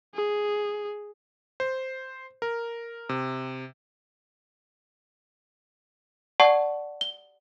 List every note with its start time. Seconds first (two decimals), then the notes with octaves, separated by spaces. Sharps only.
0.14 G#4
1.60 C5
2.42 A#4
3.09 C3
6.40 D5 F#5 A5 C#6
7.01 G7